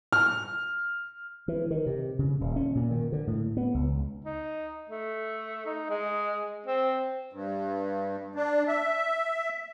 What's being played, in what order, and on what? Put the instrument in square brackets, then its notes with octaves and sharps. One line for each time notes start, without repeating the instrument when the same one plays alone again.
[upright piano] F6
[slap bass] E3
D#3
C3
C#3
D#1
C#4
A#2
D#3
D3
A2
B3
C#2
[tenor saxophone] D#4
A3
D#4
G#3
C4
[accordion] G2
D4
E5